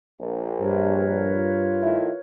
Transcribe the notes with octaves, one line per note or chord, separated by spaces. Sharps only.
A#1
G2 G4 A#4 B4 C#5
F4
D#3 A3 E4